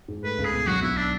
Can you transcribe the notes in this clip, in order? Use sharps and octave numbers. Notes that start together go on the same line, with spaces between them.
G#2
A3 B4
C#2
G#4
B2
F#3 F#4
B1 E4
D4